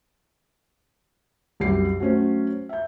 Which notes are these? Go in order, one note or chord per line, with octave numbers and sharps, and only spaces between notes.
C2 F#2 G4 C7
F#3 A3 C#4 C5
E5 G6